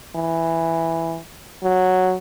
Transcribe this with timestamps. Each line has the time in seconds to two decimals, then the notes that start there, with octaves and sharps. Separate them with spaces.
0.16 E3
1.63 F#3